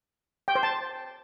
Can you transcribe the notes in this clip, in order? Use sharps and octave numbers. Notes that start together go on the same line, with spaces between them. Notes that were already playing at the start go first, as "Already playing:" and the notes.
G5
C5
A5